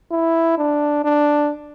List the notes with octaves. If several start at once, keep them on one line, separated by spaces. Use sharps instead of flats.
E4
D4
D4